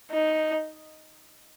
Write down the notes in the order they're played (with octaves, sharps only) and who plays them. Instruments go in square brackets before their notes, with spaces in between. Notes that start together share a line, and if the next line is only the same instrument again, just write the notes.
[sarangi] D#4